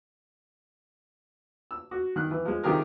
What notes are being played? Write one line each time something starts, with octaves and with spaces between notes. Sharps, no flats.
E6
F#4
D#3 F#6
E3
F3 G#3
C3 D#3 F3 G4 G#4 A#4